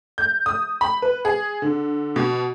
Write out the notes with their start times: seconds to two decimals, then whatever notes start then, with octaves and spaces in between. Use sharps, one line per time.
0.18 G6
0.46 D#6
0.81 B5
1.02 B4
1.25 G#4
1.62 D3
2.16 B2